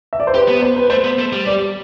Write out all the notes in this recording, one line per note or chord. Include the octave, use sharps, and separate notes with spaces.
E5
D5
C5
G4 B4
B3
C5
B4
A3 C5
B3
A3
G3
D5